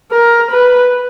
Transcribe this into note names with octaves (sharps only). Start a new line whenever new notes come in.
A#4
B4